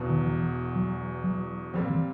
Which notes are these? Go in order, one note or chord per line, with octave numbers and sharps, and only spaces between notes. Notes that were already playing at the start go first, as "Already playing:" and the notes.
Already playing: E1 E2 B2
D#3
E3
F#3
F#3
A#2 F3 G3 C4
E3